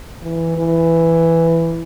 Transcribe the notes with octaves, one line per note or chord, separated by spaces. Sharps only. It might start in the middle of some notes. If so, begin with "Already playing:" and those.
E3
E3